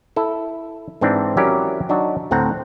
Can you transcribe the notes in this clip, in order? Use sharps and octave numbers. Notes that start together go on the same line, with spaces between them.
E4 A4
G#2 E3 C4 D4
F#3 C#4 E4 G4 A#4 D5
F#3 D4 D#4 F#4
D2 A2 C4 F#5 A#5